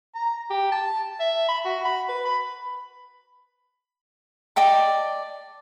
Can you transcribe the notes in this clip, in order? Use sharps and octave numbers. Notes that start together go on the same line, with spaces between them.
A#5
G4
A5
E5
B5
F#4
B5
B4
B5
D5 D#5 G5 A5